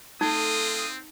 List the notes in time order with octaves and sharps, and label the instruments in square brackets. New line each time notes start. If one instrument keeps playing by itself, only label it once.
[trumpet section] G#3 F4 D#6 [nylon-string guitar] A3 A4 G5 [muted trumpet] C4 [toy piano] D#4